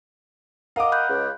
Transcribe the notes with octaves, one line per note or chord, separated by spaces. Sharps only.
A#4 D#5 F5 F#5 D6
B5 F#6 G6
C#2